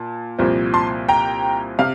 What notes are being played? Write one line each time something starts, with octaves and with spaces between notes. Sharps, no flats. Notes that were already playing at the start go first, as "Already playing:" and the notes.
Already playing: A#2 A5
C2 A#2 F3 C4
A5 C6
G5 A#5
C3 F5